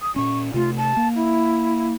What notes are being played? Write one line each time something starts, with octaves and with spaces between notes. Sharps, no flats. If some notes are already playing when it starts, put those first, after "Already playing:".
D#6
A#2 C#4 C#6
C3 A3 F4
A5
A#3
E4